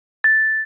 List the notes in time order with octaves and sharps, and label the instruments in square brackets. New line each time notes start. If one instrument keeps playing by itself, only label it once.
[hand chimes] A6